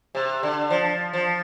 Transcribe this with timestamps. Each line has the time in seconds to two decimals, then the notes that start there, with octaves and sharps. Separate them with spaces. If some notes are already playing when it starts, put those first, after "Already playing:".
0.15 C3
0.43 D3
0.70 F3
1.13 F3